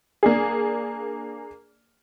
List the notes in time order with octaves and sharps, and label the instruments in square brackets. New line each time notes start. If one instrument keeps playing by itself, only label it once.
[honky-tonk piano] A#3 D4 G#4